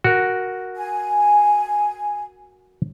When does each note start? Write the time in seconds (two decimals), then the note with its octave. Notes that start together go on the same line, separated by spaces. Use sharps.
0.04 F#4 A#4
0.77 G#5